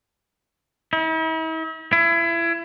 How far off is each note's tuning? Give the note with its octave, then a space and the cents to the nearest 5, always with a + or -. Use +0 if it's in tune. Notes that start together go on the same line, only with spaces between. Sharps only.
E4 -45
E4 +30